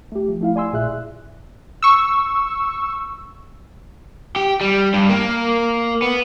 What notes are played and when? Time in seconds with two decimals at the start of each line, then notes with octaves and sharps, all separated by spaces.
0.12 A3 G4
0.28 F3
0.41 A3 E4 F5
0.56 D5 G#5 C6 E6
0.73 A#1 A#2 G#4 E5 F#6
1.83 C#6 E6
4.36 G4
4.61 G3
4.94 G2
5.09 A#3
6.02 B3